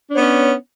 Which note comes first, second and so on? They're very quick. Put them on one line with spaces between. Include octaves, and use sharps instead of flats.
D4 C#5 B3 C#4